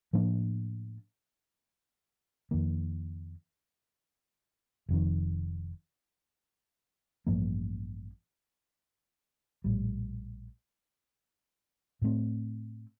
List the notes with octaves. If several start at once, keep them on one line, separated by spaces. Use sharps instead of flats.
A2 F3 A#3 D4
F2 D#3 A#3
F1 F2 D#3
A1 G2 F3 A#3
A#1 A2 G3
A2 A3 C4